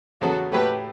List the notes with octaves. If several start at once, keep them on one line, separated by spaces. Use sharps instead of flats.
E2 C#3 F#3 B3 F#4 A4
A2 F#3 A3 G4 B4